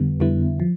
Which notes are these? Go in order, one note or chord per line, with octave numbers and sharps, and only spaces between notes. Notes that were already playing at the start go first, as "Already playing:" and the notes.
Already playing: F2 D3 G3 B3
F2 D3 G3 B3 E4
F3